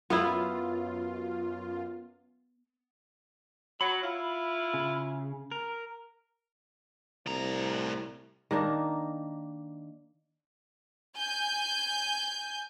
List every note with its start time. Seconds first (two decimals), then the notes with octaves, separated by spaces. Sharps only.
0.10 F#2 B3 E4 F4
3.81 F#3 B5
4.03 E4 F4
4.74 C#3
5.52 A#4
7.27 C2 A2 A#5
8.51 D#3 A#3 D4 D#4
11.17 G#5 G6